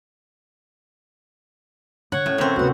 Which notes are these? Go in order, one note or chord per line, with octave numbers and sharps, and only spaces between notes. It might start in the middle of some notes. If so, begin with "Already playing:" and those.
D3 C#5 F#5
A2 C#4
F#2 D3 C4
D2 C3 B3 F#4 F#5